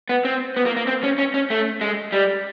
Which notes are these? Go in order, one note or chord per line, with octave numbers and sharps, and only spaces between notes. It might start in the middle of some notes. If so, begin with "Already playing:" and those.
B3
C4
B3
A#3
A#3
C4
C#4
C#4
C#4
A3
G#3
G3